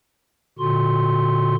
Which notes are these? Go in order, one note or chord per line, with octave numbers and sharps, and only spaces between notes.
A#2 D3 F#4 C6